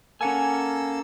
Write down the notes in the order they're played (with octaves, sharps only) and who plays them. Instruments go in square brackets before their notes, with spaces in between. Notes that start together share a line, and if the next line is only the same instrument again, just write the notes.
[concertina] A#3 A4 E6 [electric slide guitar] C#4 F#5 G#5